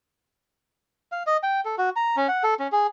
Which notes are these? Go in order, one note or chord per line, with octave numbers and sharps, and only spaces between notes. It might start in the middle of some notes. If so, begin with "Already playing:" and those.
F5
D#5
G5
A4
F#4
A#5
C#4
F#5
A4
C#4
G#4